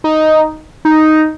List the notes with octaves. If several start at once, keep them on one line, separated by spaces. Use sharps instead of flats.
D#4
D#4